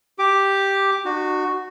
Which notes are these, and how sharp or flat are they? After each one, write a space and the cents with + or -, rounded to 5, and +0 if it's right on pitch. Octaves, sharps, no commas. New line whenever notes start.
G4 +0 D6 +0
D#4 -45 F#4 +0